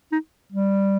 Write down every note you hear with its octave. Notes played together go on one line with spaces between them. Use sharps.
D#4
G3